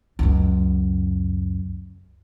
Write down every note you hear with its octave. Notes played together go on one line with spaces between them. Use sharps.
C#2 F#2